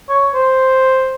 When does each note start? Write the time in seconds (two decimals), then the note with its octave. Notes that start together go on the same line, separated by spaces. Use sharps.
0.09 C#5
0.34 C5